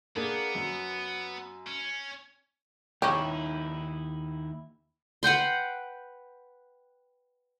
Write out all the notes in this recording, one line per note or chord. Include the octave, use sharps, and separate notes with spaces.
A#3 B3 D4 G#4
F#2
C#4
D#2 C#4 D#4 E4 G4
B4 F#5 G5 C6